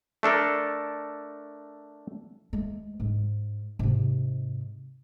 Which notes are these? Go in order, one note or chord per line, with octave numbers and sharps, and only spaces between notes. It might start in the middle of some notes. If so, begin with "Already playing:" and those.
A3 D4 A4 A#4
G#3 A3
G#2
G#2 C3